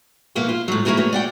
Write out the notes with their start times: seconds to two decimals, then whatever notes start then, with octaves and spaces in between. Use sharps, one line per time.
0.35 F2 B2 A#3 B3 E4
0.49 F4
0.68 A2 F#3
0.85 F3 A#3 E4 F#4 G#4 A#4
0.97 A3 B3 F#4 C#5
1.13 D5 F#5 G5